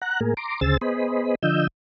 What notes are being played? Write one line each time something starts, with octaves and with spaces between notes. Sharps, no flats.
F#5 A#5 F#6
A2 A#3 G#4 A#4
A#5 C6 D6
D2 C#3 G#4 C5 E6 A6
B3 G#4 C5 D#5 B5
D3 F3 D#5 E6 G6